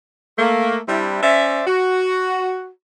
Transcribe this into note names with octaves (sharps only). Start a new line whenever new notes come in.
A3 A#3
G3 C4 D4 E4
C#4 C5 D5 E5
F#4